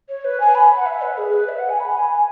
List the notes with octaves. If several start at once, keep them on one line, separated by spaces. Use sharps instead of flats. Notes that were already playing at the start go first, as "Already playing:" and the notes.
C#5
B4
G#5
B5
F#5
E5
B4
G#4
B4
E5
F#5
G#5
B5
G#5
G#5